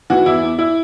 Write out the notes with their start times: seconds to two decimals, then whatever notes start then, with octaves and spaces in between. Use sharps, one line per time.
0.10 E3 F#4
0.26 E2 E4
0.42 E2
0.58 E4